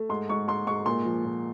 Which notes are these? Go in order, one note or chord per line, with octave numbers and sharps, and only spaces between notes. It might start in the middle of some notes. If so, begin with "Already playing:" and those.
Already playing: A3
G#2 C6
G#2 C#6
G#2 C6
G#2 C#6
A#2 C6
F3
A#2